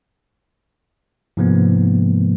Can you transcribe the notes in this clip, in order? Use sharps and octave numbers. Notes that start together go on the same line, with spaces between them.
G#2 C3 F3 G#3 A#3 B3